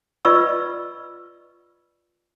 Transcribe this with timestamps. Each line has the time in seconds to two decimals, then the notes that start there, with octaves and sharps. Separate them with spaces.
0.25 F4 B4 D5 D#5 C#6 E6